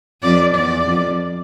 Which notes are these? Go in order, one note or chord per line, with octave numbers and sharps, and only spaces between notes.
F2 D5
E2 D5
F2